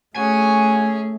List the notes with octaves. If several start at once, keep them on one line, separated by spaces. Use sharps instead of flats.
A3 C#4 F#4 G#4 G#5